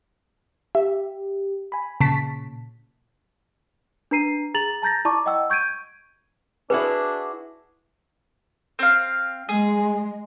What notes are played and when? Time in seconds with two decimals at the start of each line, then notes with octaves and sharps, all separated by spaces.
0.75 G4 E5
1.72 G#5 B5
2.00 A#2 C#3 A5 B6
4.11 D4 B4 A#5 C7 D#7
4.54 G#4 A#5 A6 F7 F#7
4.82 A5 A#5 G6 A6 A#6
5.05 E4 D5 A5 A#5 C#6 D6
5.26 D#5 F#5 G5 E6
5.50 C#6 G6 G#6 D7 D#7
6.70 D4 E4 F#4 G#4 B4
8.79 C4 F5
9.49 G#3 G#4